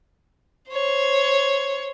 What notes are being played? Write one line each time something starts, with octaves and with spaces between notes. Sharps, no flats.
C5 C#5